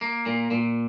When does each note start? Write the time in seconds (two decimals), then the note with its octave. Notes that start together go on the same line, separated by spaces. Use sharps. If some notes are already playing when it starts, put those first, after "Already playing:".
0.01 A#3
0.26 A#2
0.51 A#2